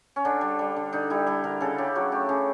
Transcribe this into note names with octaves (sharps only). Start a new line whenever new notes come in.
C#4
D3 D4
G3
G3
D3
D3 D#4
G3 E4
G3 A4
D3 A#4
C#3 A4
C#3 G4
F#3 F#4
A3 G4
C#3